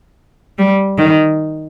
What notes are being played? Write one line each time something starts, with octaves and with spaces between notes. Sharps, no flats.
G3
D#3